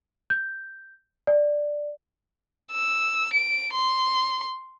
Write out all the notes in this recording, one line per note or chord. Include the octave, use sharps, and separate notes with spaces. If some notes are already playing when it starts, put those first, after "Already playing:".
G6
D5
E6
D7
C6